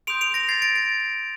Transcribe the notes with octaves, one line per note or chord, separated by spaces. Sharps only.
C6 D#6 G6 D7 F7
D7 F7
A#6 D7
A6 C7
A#6 D7
A6